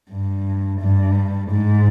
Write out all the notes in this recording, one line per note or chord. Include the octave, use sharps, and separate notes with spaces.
G2
G2
G#2